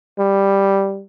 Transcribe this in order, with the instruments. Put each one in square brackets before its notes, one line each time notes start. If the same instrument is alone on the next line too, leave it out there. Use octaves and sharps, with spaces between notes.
[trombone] G3